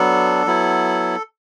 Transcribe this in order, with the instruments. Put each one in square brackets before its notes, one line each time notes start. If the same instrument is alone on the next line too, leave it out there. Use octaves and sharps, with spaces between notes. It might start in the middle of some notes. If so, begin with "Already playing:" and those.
Already playing: [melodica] F#3 B3 D4 A4
F#3 B3 E4